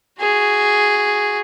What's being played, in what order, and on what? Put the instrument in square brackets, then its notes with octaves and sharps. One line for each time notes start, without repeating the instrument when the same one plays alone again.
[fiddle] F#4 G#4